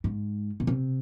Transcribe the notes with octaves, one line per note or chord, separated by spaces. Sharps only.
G#2
B2
C3